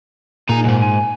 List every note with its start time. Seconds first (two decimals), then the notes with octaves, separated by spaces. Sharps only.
0.49 A#2 D#4 G#4 A#5
0.64 B1 G#2
0.82 G#5